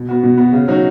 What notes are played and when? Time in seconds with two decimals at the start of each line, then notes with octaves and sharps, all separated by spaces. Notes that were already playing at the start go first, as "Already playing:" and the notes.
Already playing: B2
0.09 B3 F#4
0.24 B2
0.38 B3 F#4
0.53 C#3
0.68 F#3 D#4 F#4